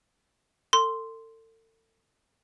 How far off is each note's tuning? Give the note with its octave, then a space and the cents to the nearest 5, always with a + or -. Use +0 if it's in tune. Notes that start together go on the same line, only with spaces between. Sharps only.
A4 +35 C6 -5